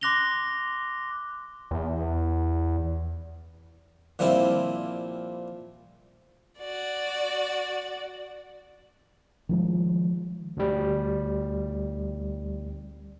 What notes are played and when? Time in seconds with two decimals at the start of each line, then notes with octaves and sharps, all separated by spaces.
0.01 C6 D6 F#6 A#6 F7 G7
1.71 E2
4.19 A#2 F3 G3 C4 E4
6.58 F#4 D5
9.49 D#3 F3 G#3
10.57 D2 G3